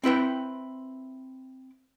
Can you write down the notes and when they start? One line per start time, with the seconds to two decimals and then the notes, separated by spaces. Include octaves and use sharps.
0.04 C4 E4 B4 G5